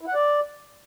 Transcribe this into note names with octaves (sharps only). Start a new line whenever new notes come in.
E4
F#5
D5